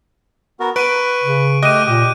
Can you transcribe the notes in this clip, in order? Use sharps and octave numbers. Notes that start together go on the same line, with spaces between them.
B3 F#4 A#4
B4 C#6 D7 D#7
C#3
A3 G4 D#5 F#6 D#7
A#2 G4